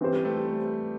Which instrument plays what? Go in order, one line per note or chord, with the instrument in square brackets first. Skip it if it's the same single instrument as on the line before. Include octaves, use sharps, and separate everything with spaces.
[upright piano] E3 C4 G4 C5
[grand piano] G3
A3
G3